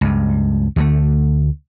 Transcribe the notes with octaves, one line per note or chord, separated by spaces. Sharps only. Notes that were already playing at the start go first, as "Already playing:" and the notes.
C#2 G2
D2 D3 D#3 A3